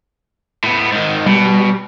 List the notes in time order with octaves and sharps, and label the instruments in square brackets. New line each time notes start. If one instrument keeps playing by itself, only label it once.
[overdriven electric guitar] A2 B3
G#2 D#3
[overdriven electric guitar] B2 [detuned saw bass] G3